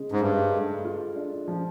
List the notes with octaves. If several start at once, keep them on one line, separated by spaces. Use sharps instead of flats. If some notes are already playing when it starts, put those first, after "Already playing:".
Already playing: C#3 G#3
G#2
G2 G#3
A3
F4
D4
F3